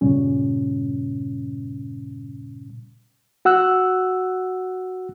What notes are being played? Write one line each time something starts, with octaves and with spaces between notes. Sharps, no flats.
E2 G2 A#2 C#3 G3 C#4
F#4 F#5 E6 F#6